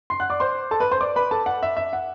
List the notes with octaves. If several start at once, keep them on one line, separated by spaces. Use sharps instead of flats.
C6 C7
F#5 F#6
D5 D6
C5 C6
A4 A5
B4 B5
C5 C6
D5 D6
B4 B5
A4 A5
F#5
E5
E5
F#5